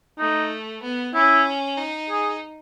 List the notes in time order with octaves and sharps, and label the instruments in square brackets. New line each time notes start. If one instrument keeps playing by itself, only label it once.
[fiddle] A3 [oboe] D#4
[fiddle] B3
[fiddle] C#4 [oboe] E4
[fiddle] D#4
[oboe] G#4